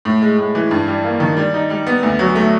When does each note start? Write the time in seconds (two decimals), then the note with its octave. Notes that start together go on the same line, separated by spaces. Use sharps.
0.05 A2
0.22 G#3
0.38 A2
0.55 E3
0.71 G2
0.88 G3
1.04 A#3
1.20 D#3
1.37 G3
1.54 D#4
1.70 G3
1.87 B3
2.03 D2
2.19 F#3
2.36 A3